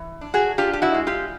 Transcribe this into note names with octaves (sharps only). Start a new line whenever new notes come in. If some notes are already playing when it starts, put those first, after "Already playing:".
Already playing: E3
D4
F#4 G#4
D4 F4 G4
G4
E4 F#4
G#3
F4 G4